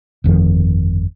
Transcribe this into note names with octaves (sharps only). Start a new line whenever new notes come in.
G1 F2 D#3 F3